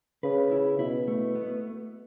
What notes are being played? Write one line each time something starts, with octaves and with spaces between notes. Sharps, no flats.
C#3 B4
E4
B2 E4
A3
B3